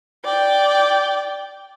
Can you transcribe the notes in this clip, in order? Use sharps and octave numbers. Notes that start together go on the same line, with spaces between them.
D5 G5